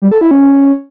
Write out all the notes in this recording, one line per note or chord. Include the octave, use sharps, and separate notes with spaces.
G3
A4
E4
C#4